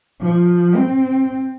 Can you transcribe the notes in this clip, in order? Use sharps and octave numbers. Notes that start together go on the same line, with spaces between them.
F3
C4